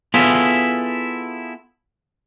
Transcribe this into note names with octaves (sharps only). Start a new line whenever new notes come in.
B3 E4 F4 G#4 A4